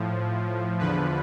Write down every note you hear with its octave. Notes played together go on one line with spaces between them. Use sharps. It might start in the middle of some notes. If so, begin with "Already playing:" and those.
Already playing: A2 F3
E2 D3 F3 B4